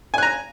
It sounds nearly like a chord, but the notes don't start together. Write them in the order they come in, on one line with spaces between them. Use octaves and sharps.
G#5 F#6 A#5